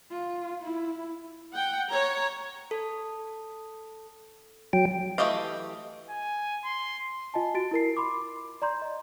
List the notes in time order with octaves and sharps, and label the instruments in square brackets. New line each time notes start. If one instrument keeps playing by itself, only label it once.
[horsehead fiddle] F4
E4
[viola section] F#5 G5
C#5 A#5
[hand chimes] A4
[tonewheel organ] F#3 G5
[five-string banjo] E3 A3 G4 D#5 F5
[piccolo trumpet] G#5
C6
[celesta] F4 D#5 G#5 A5
F#4 A6 D7
E4 A#4 C7
B5 C6 D6
D5 A#5 C6 G6
D#5